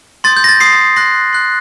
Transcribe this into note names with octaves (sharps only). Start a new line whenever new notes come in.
C6 D#6 G6 A6
G6
A#6
A6
C6 D#6 G6 C7
C6 F#6 A#6
C6 F#6